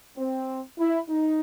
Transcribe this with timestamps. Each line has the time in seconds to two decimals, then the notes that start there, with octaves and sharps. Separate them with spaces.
0.17 C4
0.78 E4
1.09 D#4